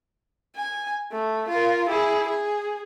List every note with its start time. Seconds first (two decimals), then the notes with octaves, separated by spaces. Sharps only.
0.56 G#5
1.12 A3
1.49 F4 A#4
1.89 E4 G#4
2.28 G#4